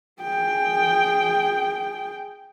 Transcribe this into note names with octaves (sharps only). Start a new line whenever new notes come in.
G#4 G5